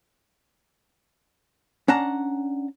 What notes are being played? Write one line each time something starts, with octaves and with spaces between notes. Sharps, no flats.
C#4 D4 F#5 A5 A#5